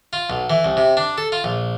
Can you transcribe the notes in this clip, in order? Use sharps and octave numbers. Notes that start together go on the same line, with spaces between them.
F4
B1
E3
C2
C3
D4
A4
F4
A#1